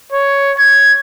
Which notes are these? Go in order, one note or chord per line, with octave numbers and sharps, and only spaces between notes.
C#5
G#6